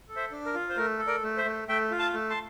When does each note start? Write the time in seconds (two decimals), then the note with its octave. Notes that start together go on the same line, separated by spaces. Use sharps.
0.08 A4
0.16 C5 E5
0.31 D4
0.46 A#4
0.54 F4
0.69 C5
0.77 A3 A#4
0.99 A4
1.07 A#4 D5
1.23 A3
1.37 C5 E5
1.45 A3
1.68 A3 E5 G5
1.91 F4
1.99 F5 A5
2.14 A3
2.30 A5 C6